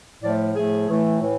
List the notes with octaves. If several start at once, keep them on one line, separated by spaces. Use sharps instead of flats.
A2 F3 A3 D5
A2 F3 A3 G#4
A2 E3 A3
A2 E3